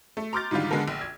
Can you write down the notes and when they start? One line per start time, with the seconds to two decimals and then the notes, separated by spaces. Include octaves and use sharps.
0.17 A3
0.33 A#5 C6 D6 F6 G6 A6
0.51 G#2 D3 D#3 G3 F4
0.71 D3 G#3 B3 A4 A#4
0.88 A#1
1.01 G#6